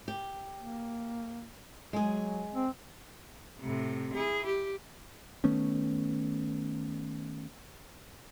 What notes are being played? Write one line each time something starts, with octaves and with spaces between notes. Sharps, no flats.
G4
A#3
F#3 G#3 G#4
C4
A2 C3
E4 G#4
G4
D#3 A3 B3 C#4